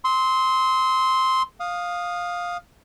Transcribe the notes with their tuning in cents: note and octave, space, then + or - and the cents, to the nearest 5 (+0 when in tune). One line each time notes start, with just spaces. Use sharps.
C6 +0 E6 -45
F5 +15 D#6 -10